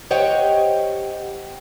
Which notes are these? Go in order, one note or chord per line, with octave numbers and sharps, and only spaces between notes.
G4 C5 C#5 D#5 F#5 G5